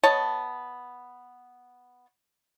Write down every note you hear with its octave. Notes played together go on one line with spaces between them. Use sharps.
B3 C#5 D#5 A5